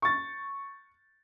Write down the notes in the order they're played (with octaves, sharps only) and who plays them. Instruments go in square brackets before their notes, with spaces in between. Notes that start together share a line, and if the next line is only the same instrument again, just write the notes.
[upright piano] C#6 A6